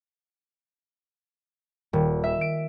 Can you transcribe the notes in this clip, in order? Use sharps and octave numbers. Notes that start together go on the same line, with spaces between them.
D#1
E5
D7